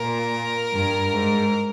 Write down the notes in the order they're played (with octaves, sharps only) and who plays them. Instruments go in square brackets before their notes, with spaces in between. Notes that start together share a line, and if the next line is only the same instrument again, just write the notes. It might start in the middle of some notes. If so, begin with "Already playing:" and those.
Already playing: [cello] A#2 [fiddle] A#4
[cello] G2
G#2